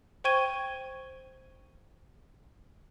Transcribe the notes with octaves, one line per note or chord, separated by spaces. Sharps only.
C5 G5 C#6 G#6 D#7 G7